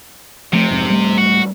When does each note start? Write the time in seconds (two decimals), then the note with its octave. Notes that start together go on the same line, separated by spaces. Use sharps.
0.53 C3 F3 A3
0.71 F1 F2 G#2
0.88 D1 G3 A3
1.18 F#4